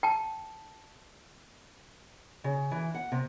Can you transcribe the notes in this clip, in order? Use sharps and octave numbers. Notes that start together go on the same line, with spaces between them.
G5 A5
C#3
E3
F#5
C3